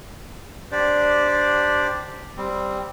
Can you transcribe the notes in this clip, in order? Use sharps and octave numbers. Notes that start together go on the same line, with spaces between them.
D4 G4 C5 D5
G3 C4